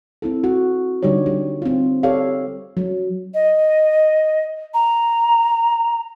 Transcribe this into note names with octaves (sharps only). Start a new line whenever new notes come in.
C4 E4 A4
F#4
D3 G3 D#4 G4 C#5
G3
C4 F4
G4 A4 C#5 D5 F5
F#3
D#5
A#5